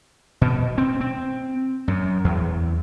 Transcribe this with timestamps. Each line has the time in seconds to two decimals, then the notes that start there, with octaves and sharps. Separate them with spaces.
0.41 B2
0.78 C4
1.01 C4
1.88 F#2
2.24 E2